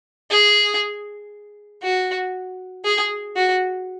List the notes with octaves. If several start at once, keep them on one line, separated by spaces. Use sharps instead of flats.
G#4
F#4
G#4
F#4